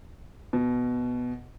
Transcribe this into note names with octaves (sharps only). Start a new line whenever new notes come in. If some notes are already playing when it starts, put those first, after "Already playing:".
B2